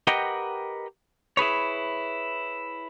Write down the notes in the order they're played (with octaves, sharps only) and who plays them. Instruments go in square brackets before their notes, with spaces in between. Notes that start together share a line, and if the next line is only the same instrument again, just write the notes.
[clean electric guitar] G4 A#4 B4 D#5 F#5 G5
E4 G#4 B4 C#5